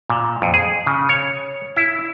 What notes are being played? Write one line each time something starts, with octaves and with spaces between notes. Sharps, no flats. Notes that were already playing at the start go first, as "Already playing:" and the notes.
A#2
F2
G#4
C#3
C#5
E4